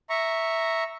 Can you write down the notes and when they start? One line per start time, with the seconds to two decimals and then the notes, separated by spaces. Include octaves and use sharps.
0.10 E5 A#5 C#6